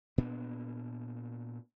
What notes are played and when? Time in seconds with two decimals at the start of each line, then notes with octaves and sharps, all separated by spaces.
0.18 A#2 B3 D4